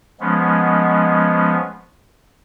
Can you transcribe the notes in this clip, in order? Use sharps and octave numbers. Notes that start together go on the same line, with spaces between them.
F3 G#3 B3 C#4